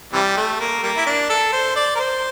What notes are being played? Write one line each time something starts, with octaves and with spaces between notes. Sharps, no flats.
C3 E3 G3
A3
A#3
G3 A#3
E4
D4
A4
C5
D5
A#4
C5